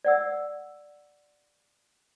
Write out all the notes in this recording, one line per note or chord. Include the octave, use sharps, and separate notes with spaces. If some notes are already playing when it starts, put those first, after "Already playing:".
D5 F#5 E6